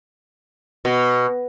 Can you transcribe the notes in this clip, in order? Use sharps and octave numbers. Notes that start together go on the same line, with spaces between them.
B2